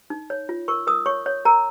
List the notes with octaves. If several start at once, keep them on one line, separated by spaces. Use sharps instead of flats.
D#4
C#5
F4
A#4 C#6
A#4 D#6
C#5 C#6
C#5
A#4 A#5